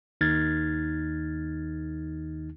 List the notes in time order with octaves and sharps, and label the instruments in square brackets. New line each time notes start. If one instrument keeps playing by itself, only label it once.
[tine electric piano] D#2 D#3 D#4 F6 G#6 A6